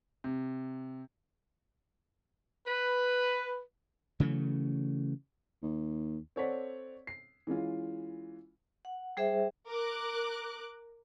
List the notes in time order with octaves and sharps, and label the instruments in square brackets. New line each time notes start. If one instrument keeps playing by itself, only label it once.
[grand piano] C3
[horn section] B4
[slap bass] C#3 E3 F#3 A3
[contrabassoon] D#2
[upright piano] C4 A4 C#5 D5 F#5 B6
C7
E3 G#3 C#4 F4
[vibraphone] F#5
G3 G#4 C5 E5
[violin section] A#4 D6 F#6